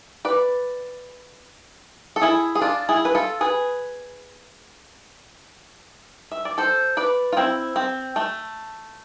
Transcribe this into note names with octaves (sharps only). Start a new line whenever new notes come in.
B4 D5
A4
E4 G#4
G#4
D4 F4
E4 G#4
B4
F4 A4
G#4 B4
E5
D5
A4 C5
B4 D5
F4
C4 E4
C4
A3